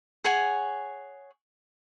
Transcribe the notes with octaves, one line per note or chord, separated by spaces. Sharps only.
G#4 C#5 F#5 G#5